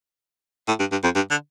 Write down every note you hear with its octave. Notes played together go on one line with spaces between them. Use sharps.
A2
G2
G2
F2
G2
D3